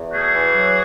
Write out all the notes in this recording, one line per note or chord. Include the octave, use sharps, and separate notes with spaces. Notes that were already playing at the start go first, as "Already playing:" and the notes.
Already playing: E2
A3 F#4 G#4
E3
F#3